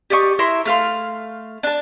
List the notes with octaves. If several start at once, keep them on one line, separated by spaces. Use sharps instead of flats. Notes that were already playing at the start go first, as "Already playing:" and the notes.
G4 D5 D#5 C#6
E4 A#4 E5 C6
A3 F5 C6
D4 A5